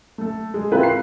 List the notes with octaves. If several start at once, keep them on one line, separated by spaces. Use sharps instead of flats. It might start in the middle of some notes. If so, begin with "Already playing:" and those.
A3 A4
G#3
C4 E4 F4 A#4 B4
C7